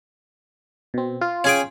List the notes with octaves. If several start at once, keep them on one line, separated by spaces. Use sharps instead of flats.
B2 C4
F4
C#4 G#4 G5